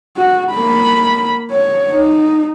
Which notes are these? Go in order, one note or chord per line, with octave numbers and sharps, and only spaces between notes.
F#4
A#3 B5
C#5
D#4